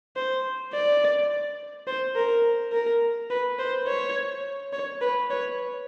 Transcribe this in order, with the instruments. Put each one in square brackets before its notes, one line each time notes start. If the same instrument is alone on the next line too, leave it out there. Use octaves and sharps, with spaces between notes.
[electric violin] C5
D5
C5
A#4
A#4
B4
C5
C#5
C#5
B4
C#5